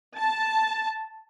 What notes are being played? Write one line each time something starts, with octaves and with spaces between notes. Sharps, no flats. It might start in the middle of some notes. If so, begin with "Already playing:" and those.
A5